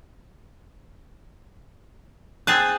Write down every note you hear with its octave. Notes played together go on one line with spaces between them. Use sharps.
C4 G#4 A5 F#6 A6